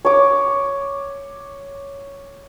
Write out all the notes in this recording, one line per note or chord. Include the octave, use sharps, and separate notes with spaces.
C#5 D6